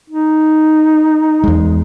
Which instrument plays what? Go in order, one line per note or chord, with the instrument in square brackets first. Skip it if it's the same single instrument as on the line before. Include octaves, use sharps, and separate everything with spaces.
[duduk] D#4
[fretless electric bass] E2 G#3